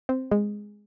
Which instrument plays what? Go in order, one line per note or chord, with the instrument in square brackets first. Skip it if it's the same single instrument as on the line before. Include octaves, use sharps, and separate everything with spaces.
[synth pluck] C4
G#3